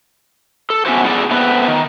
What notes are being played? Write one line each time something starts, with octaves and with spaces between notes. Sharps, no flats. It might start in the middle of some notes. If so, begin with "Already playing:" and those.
A4
B3 C#4 D4 E4 F#4 C5
A3 D4 E4 F#4 G#4 D5
A3 B3 C4 B4
D#3